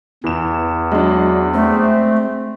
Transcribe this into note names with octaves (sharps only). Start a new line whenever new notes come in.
E2 E3 E7
F#3 G#3 D4
A3 C4